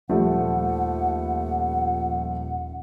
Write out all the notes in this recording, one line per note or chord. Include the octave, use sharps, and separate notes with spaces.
D#1 D#2 F3 G3 A3 F#5